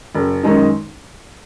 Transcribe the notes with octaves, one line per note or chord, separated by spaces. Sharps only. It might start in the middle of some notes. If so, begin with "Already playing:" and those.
F#1
F#2 D#3 G#3 D#4